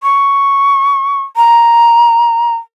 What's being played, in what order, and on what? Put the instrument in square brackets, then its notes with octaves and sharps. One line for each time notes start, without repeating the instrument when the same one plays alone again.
[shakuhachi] C#6
A#5